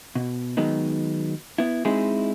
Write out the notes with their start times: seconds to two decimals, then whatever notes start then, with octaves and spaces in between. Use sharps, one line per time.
0.15 B2
0.57 D#3 F#3 G#3 B3 D#4
1.58 B3 E4
1.85 G#3 C4 D#4 E4 F#4 G#4